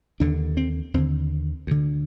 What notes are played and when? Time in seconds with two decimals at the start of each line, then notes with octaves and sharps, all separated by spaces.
0.20 D#2 D3 D4
0.57 C4
0.94 D#2 D3 C4
1.67 D2 D3